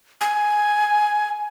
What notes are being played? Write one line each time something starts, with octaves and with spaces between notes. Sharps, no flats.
G#5